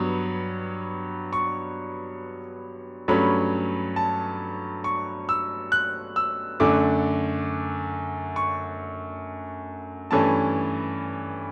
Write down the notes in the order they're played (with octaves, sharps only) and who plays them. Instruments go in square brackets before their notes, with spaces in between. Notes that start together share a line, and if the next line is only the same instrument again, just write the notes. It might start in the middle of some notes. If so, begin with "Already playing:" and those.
Already playing: [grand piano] G2 F#3 B3
C#6
G2 F#3 A3 C#4 B5
A5
C#6
E6
F#6
E6
F#2 D3 A3 D6
C#6
G2 E3 A3 C#4 A5